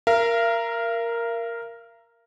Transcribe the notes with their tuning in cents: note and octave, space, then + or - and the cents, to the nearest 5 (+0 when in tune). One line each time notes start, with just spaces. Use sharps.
A#4 +0 F5 -45